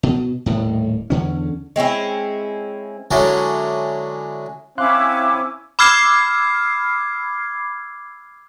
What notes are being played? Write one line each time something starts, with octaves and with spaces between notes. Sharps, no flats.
B2
D#1 A2
E2 D3 C#4
G#3 C4 C#4 E4
D3 F#3 G#3 C#4 E4 D5
C4 C#4 E4 F5 C6 D6 F#6
B5 D6 E6 F6 G#6 C7